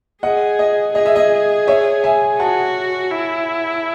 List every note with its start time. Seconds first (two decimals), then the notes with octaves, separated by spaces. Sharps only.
0.23 G#4 D#5 F#5
0.59 D#5
0.95 G#4 D#5
1.06 E5
1.16 D#5
1.67 C#5 E5
2.04 E5 G#5
2.39 F#4 F#5 A5
3.11 E4